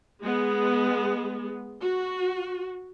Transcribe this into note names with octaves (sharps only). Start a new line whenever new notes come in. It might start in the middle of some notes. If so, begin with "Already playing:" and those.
G#3 B3
F#4